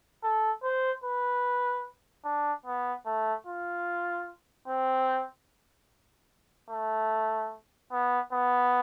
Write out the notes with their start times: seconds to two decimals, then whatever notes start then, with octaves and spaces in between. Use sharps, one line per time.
0.23 A4
0.63 C5
1.04 B4
2.25 D4
2.66 B3
3.06 A3
3.46 F4
4.68 C4
6.70 A3
7.92 B3
8.33 B3